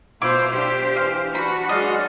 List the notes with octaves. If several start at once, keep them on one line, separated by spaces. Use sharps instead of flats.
B2 E4 F4 C5 D6
D4 G4 C5
E3 F5
D4 F#4 B5
F#3 G#3 D5 D#5 F5